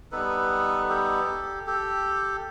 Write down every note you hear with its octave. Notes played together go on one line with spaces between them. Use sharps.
G3 B3 D#4 A4 B4
G4 A4
G4 A4